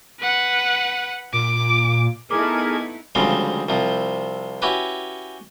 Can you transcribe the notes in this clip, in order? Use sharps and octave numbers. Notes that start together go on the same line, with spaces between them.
B4 F#5
A#2 D6
A3 B3 D#4 E4 G#4 A#4 D6 G#6
D2 C#3 F3 G3 G#3 C4
C2 C3 F3
C#4 E4 F#4 G4 B4